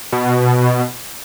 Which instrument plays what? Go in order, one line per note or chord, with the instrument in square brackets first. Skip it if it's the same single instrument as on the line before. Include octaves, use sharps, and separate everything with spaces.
[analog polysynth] B2